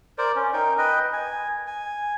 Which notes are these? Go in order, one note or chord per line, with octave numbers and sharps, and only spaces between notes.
A#4 C5 D5
C#4
D#4 A#4 G5
B4 D#5 G5
G#5
G#5